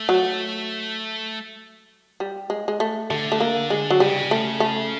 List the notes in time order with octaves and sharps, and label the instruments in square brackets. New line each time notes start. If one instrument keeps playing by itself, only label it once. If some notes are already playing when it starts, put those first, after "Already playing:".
Already playing: [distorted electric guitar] A3
[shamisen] F#3
G3
G#3
G#3
A3
[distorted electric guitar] D3 [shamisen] A3
[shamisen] A3
A#3
G#3
F#3
[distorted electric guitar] C#3 [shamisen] G3
[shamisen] A3
A3